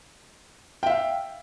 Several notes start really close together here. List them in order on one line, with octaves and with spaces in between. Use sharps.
G5 E5 F5